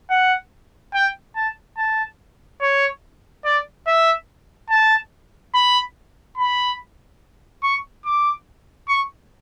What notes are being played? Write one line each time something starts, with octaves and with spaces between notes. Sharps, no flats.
F#5
G5
A5
A5
C#5
D5
E5
A5
B5
B5
C#6
D6
C#6